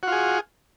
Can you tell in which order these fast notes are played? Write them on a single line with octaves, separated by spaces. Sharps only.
F#4 F4 G#4